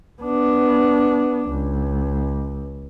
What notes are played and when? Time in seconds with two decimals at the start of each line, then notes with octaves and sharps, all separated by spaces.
0.23 B3 D4
1.50 C#2